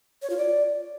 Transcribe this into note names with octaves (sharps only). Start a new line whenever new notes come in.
C#5
F4
D5